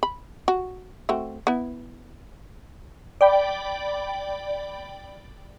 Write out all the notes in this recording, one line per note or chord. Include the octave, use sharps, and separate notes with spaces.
B5
F#4
A3 C4 F#4
B3 E4
D5 G5 B5